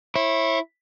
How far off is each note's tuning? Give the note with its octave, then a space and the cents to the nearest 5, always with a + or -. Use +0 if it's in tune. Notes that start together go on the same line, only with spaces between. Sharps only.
E4 +0 C#5 -35